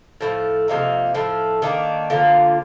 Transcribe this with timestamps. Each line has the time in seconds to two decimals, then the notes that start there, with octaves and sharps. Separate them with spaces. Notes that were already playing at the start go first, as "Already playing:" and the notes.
0.21 A2 F3 A3
0.68 C3 F3 A#3 D#4
1.14 A2 F3 A3
1.62 D#3 A#3 D4
2.10 D3 F3 A#3 F4